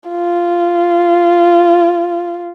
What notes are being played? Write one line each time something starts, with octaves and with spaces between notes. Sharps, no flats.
F4